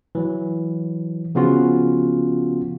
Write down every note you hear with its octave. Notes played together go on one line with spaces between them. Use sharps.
E3 F#3
C#3 F3 B3 C#4 F4 F#4